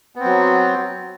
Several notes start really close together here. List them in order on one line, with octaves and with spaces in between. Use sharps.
B3 C4 F#3